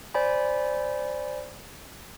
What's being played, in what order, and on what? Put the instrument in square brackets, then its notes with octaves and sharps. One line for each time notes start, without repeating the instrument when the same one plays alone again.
[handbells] C5 D5 G#5 B5